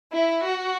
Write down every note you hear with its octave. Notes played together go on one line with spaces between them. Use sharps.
E4
F#4